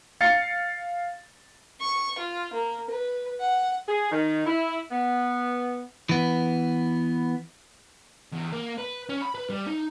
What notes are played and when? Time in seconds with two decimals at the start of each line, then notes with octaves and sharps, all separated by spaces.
0.21 F5 A6 C#7
1.81 C#6
2.19 F4
2.53 A#3
2.90 B4
3.41 F#5
3.88 G#4
4.11 D#3
4.46 E4
4.91 B3
6.09 E3 B3
8.33 E2
8.52 A#3
8.78 B4
9.09 C#4
9.22 B5
9.35 B4
9.50 G3
9.67 D#4